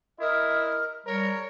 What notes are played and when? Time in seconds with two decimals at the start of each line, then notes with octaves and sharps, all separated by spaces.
0.20 E4 A#4 D#5
1.06 G3 A#4 C#5